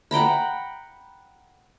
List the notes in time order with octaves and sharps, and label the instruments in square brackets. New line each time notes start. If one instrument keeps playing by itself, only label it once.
[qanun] F#5 G5 A#5 B5